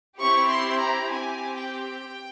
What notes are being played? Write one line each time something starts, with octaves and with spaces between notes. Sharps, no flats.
C4 E4 G4 C#6
C6
A#5
C4 G4 G#5
G5